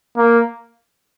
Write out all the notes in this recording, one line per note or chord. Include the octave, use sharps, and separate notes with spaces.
A#3